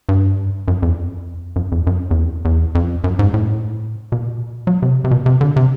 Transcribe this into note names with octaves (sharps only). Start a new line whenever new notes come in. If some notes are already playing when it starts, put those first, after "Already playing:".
G2
F#2
F2
F#2
F2
F#2
F2
E2
F2
E2
F2
F#2
G#2
A2
B2
A#2
F#3
C3
C3
B2
C3
D3
C3